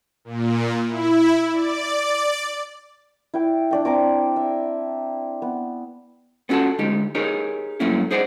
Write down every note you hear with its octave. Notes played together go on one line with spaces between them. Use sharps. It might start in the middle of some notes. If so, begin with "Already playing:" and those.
A#2
E4
D5
E4 G5 D6
D4 D5 G5
C4 A#5 D6
E5
B3
B3 C#4 F#4 A4 F#5 A5
D2 G#3 D#4 G4
D#4 G4 G#4 A#4 C#5
G2 F#3 A3 A#3 C#4 E4
D#4 G#4 C5 D5 D#5 F#5